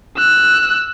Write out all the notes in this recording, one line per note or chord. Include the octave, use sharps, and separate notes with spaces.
E6 F#6